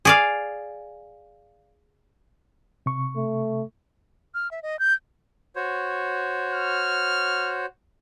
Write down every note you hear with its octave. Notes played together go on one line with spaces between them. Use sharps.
G#4 D5 F5
C3 C#6
A3
F6
E5
D#5
G6
F#4 C5 C#5
F6